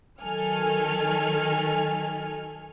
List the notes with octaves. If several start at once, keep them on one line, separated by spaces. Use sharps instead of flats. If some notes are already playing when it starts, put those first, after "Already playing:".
D#3 F#3 A4 G#5 F6